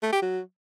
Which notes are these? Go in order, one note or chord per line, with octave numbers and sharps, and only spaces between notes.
A3
G4
F#3